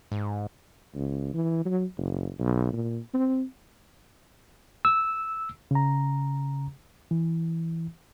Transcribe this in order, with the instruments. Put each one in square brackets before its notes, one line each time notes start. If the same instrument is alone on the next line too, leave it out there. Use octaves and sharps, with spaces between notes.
[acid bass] G#2
[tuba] C#2
E3
F#3
F#1
B1
A#2
C4
[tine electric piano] E6
[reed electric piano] C#3 A#5
E3